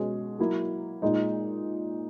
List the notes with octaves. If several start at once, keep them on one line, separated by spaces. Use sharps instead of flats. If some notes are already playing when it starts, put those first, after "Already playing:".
Already playing: B2 G#3 C#4 G#4
F#3 A#3 E4
A#2 G#3 D#4